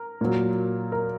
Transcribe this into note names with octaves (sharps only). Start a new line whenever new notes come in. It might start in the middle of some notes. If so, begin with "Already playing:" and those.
Already playing: A#4
A#2 F#3
A#4